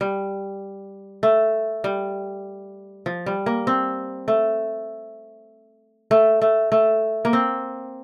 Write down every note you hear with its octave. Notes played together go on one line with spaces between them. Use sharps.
G3
A3
G3
F3
G3
A#3
C4
A3
A3
A3
A3
A#3
C4